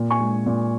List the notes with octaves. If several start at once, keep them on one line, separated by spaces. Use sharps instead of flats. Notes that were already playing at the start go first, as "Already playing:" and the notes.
Already playing: A#2
G#5 C#6
G#3
A#2